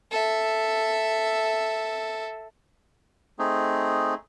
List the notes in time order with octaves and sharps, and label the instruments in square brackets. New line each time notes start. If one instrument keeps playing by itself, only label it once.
[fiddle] A4 E5
[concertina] A3 C4 D#4 G#4